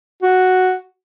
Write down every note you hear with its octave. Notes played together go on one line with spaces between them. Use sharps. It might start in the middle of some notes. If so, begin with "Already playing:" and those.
F#4